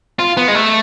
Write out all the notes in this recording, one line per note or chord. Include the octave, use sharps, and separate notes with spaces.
F4
B3
G#3
A3